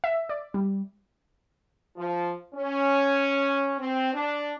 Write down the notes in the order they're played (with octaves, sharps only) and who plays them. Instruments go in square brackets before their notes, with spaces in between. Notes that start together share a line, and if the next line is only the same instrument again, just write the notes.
[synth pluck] E5
D5
G3
[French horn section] F3
C#4
C4
D4